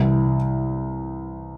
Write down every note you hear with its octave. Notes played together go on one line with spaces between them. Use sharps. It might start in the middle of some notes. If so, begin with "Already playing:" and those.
Already playing: C2 C3 E3